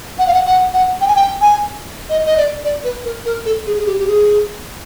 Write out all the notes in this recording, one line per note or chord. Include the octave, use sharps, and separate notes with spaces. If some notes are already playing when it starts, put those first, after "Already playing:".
F#5
F5
F#5
F#5
F#5
G5
G#5
G5
G#5
D#5
D#5
D5
D5
B4
A#4
A#4
A4
G#4
G#4
G4
G4
G#4